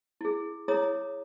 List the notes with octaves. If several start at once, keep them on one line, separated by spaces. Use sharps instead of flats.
E4 G#4
E4 G#4 C#5 A#5 D#6